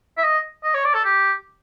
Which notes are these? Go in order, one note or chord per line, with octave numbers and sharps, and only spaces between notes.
E5
D#5
D#5
C#5
D5
A4
G4